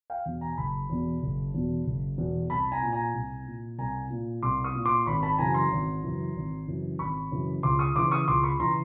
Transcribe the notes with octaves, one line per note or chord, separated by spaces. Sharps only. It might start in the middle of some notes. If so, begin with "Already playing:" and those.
F5 G5
E2 B2
G#5 A#5
F#1 A5 B5
E2 B2
F#1
E2 B2
F#1
E2 B2
C2 A5 B5
G#5 A#5
A#2
G#5 A#5
C2
A#2
C2 G#5 A#5
A#2
C2 C6 D6
C#6 D#6
A#2
C6 D6
G#1 B5 C#6
A5 B5
F#2 C#3 E3 G#5 A#5
A#5 C6
G#1
F#2 C#3 E3
G#1
F#2 C#3 E3
G#1 B5 C#6
F#2 C#3 E3
C#2 C6 D6
C#6 D#6
C#3 E3 C6 D6
C#6 D#6
C#2 C6 D6
B5 C#6
C#3 E3 A#5 C6